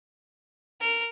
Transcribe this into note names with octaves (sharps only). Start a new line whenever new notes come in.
A#4